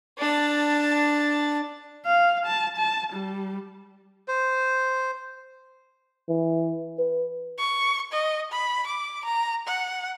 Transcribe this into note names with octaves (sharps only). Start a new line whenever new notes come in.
D4 A5
F5
A5
A5
G3
C5
E3
B4
C#6
D#5
B5
D6
A#5
F#5